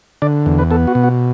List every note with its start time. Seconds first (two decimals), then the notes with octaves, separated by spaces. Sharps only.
0.22 D3 D5
0.46 E2
0.59 B4
0.71 B3 A4
0.87 F#4
0.95 B2
1.04 F#4